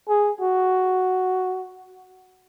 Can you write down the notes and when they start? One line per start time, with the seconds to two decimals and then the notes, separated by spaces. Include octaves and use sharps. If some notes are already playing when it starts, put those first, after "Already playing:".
0.08 G#4
0.41 F#4